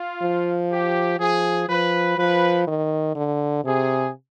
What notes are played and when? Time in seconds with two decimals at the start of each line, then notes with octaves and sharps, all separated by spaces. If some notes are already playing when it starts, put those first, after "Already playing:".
Already playing: F4
0.22 F3
0.71 G4
1.20 F3 G#4
1.69 F3 B4
2.18 F3 B4
2.68 D#3
3.15 D3
3.65 C3 G#4